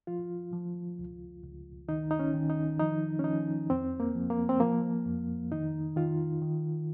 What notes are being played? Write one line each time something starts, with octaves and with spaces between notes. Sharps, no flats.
F3 F4
F3
C#2
C#2
D#3 D#4
D#4
C#4
D#3
D#4
F3 D#4
C#4
F3 D#4
F2 C4
A#3
F3
A#3
C4
F3 A#3
F2
D#3 D#4
D#3 F4
D#3